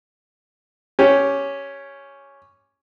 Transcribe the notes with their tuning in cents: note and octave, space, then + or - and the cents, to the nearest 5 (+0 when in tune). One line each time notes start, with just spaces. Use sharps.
C#4 +0 G4 +0